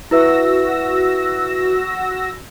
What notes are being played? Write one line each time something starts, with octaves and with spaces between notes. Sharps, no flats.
E4 F#4 B4 E5 E6 A#6